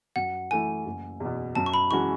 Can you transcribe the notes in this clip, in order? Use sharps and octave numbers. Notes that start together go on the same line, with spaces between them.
F#2 F#5
E3 A3 E4 G#5
F#1
E2 B2
F#2 A5
C#6
B5
E3 G#3 C#4 F#4 C#6